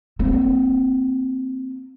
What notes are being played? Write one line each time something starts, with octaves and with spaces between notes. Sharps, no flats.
A#3 C4